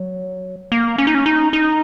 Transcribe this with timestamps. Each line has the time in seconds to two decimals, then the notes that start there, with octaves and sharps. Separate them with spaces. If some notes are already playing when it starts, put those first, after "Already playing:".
Already playing: F#3
0.72 A#3
0.98 C#4
1.07 D#4
1.14 C#4
1.26 D#4
1.53 D#4